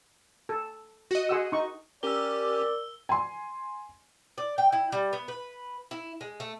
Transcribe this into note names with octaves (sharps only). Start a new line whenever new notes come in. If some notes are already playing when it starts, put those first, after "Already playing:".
A4
F#4 D#5
G#4 F#5 E6
D#4 C#6
C#4 G4 A#4 D5 E6 G7
G#5 C6
D5
G5
E4
G3
B3
B4
E4
G#3
A3